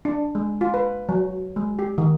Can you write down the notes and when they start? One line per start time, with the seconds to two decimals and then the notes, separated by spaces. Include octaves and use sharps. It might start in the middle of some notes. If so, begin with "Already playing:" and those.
0.05 D4
0.35 G#3
0.61 F4
0.74 B4
1.09 F#3
1.56 G#3
1.79 G4
1.98 D#3